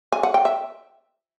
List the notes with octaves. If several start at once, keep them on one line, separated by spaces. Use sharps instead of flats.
G#5
F#5
G5
E5